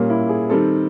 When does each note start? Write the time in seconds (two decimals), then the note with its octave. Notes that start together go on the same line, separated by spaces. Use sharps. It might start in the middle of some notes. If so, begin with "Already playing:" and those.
Already playing: A#2 G3 A#3 C#4
0.10 E4
0.29 G#4
0.50 D#3 G3 C4 A4